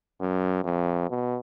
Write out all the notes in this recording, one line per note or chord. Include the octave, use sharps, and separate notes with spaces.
F#2
F2
B2